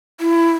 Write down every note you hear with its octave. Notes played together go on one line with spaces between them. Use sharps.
E4